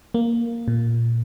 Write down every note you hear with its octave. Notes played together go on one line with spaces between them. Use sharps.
A#3
A#2